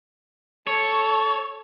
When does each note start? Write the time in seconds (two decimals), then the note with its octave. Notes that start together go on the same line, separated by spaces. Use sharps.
0.67 A4 C#5